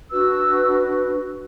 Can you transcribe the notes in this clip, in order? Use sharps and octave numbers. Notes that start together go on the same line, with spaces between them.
D4 F#4 B4 E6